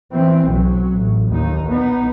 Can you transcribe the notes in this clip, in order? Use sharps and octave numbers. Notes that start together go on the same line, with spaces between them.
E3 C4
B1 F#3
A1
D#2 D#4
B3 D#4